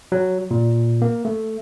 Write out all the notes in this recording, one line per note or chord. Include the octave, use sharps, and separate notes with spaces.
F#3
A#2
A#3
A3